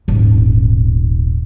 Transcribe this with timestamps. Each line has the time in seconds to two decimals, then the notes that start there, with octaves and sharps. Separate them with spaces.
0.08 D#1 G#1